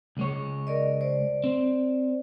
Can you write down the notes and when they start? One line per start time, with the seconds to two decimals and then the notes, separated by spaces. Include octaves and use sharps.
0.17 C#2 G#3 C#5
0.67 A#4 D5 D#5
1.01 C5 D5
1.44 C4